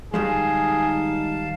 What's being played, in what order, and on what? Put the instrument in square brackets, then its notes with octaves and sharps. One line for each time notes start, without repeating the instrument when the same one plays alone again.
[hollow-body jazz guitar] D#3 G3 G#3 [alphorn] D#4 [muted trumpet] G#4 [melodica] F5 A5